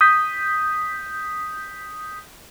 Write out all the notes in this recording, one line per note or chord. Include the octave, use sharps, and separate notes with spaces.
D#6 G6 B6